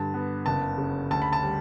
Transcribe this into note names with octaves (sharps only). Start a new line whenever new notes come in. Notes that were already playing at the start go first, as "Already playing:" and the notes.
Already playing: G2 D3 A5
B3
F#1 A5
C#3
D2 A5
B5
A5
G3